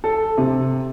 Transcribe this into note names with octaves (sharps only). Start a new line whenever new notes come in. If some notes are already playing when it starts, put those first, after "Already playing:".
A4
C3